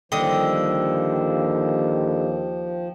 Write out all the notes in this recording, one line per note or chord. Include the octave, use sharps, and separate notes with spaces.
D#2 D3 F3 G3 D#5 G5